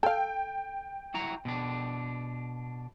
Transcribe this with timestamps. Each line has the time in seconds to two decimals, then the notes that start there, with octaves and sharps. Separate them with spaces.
0.03 A4 F5 G5
1.14 E4 F#4 A#5
1.45 B2 D4